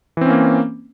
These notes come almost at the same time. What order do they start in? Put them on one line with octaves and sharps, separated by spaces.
E3 C4 C#4 A#3